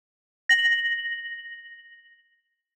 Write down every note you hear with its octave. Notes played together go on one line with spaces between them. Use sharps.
A#6 F#7